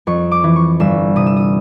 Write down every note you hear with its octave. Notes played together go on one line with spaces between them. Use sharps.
F2 C#6
D6
E3
C#6
G1 E6
C3 D#6
E6
D#6